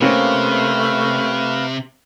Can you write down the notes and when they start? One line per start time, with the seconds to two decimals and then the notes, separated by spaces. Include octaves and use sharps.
0.01 C3 A3 A#3 C4 C#4 B4 F5